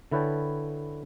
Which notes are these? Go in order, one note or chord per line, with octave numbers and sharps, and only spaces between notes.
D3 E4 B4 C#5 G5 A5